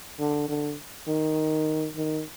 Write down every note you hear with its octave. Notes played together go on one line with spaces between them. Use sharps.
D3
D3
D#3
D#3